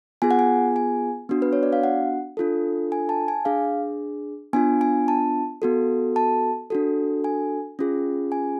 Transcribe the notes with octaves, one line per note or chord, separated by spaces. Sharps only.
B3 F4 G#4 G#5
F#5
G#5
G#5
B3 D4 F#4
B4
C#5
D5
F5
F#5
D4 F4 A4
G#5
A5
G#5
D4 G#4 F5
B3 D4 F4 G#5
G#5
A5
B3 F#4 A4
A5
D4 F#4 A4
G#5
C#4 F4 G#4
G#5